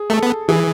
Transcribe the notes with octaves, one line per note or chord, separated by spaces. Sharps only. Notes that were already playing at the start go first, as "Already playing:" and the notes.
Already playing: G#4
A3 A4
B3
E3 G#4